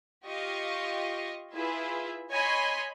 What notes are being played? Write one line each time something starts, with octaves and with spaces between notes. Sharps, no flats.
F4 G4 D#5 F5 C#6
E4 F4 G#4 B4 E5
C#5 D#5 G#5 B5 C6